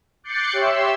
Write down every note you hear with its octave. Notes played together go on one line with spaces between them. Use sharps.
D6 F#6 G6 A6 C7 C#7
G4 C#5 E5 C6 E6